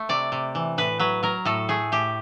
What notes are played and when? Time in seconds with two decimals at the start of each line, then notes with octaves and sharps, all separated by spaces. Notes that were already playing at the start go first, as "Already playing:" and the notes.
Already playing: A3
0.09 C3 D5
0.32 C3
0.55 E3
0.78 A2 B4
1.00 F#3 B4
1.23 F#3 A#4
1.45 A2 A4
1.69 A3 G#4
1.92 A2 G4